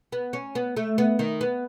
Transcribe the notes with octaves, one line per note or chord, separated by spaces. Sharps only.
B3
C#4
B3
A3
B3
D#3
B3